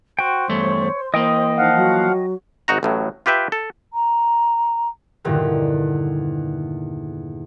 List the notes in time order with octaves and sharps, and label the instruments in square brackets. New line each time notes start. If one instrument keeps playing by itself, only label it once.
[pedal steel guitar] F#4 G5 [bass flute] C5
[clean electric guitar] E2 G2 A3 [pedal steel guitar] C#5
[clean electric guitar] E3 A#3 [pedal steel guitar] D#5 G5 D#6
[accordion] F3 F5 F#5 [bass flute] D#4
[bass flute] F#3
[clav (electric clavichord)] G#1 D#4 F#4 A#5
A1 A2 F#3
F4 G4 B4 E5 G5
A4
[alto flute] A#5
[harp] E2 G2 A#2 D3 D#3